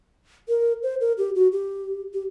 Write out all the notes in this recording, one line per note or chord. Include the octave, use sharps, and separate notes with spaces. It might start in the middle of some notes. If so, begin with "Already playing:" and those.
A#4
C5
A#4
G4
F#4
G4
G4